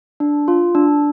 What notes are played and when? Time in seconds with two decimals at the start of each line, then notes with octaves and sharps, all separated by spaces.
0.20 D4
0.48 F4
0.75 D4